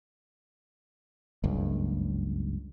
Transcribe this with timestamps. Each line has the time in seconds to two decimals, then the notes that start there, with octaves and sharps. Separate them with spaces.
1.44 F#1 C#2 G2